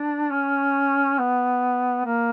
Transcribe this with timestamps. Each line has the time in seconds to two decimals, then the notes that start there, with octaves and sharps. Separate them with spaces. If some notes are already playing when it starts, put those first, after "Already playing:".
Already playing: D4
0.31 C#4
1.19 B3
2.06 A#3